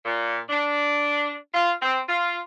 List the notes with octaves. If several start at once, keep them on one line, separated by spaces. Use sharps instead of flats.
A#2
D4
F4
C4
F4